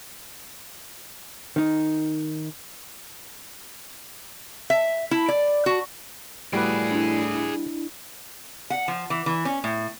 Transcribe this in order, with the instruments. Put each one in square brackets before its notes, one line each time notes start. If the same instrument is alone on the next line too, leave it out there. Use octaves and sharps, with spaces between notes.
[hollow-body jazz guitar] D#3 D#4
[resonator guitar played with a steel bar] E5
E4
D5
F#4
[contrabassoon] A2 [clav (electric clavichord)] G3 F#4 B4 [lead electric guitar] G#4 D5
[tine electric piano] D4 E4
[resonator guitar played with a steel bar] F#5
F3
E3
E3
C#4
A2